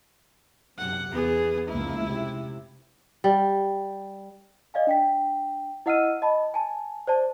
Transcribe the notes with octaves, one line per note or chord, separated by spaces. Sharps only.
F#2 C3 F#5
E2 B3 G#4
F1 C#2 A#3 E4
C3
G3
D5 D#5 F5 G#5
D4 G5 B6
E4 D#5 F#5 E6 F6 D#7
D#5 A5 B5
G#5 A5
C5 D5 A5